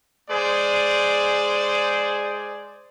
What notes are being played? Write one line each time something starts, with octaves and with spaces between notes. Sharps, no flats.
G#3 G#4 C5 D5